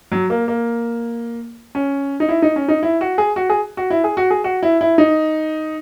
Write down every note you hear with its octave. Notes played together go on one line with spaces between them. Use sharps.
F#3
A#3
A#3
C#4
D#4
E4
D#4
C#4
D#4
E4
F#4
G#4
F#4
G#4
F#4
E4
G#4
F#4
G#4
F#4
E4
E4
D#4